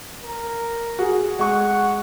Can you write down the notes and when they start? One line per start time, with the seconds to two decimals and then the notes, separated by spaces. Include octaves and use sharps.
0.23 A#4
0.99 F#4 G#4
1.39 G#3 F#5 C#6